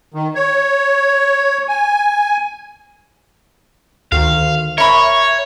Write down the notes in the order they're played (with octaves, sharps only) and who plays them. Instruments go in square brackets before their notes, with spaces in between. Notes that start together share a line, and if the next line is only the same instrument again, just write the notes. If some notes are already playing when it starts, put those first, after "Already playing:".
[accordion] D#3
C#5
G#5
[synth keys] D2 D#3 [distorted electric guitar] F5
[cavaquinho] A#4 B5 C#6 [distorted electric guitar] C#5 [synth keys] E5